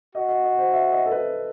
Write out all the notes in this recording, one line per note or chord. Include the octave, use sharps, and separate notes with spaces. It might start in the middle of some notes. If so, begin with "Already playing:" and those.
F#4 D#5
D#5
D#5
C5
E5
D#5
A4
B4